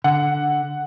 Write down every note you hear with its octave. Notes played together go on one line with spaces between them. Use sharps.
D3 F#5